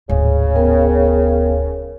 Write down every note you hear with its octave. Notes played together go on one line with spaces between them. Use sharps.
D1 G#1 C#3
B3 A#4 G5